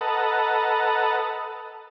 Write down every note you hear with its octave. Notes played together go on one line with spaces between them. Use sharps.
A4 B4 D#5 F#5 A5 A#5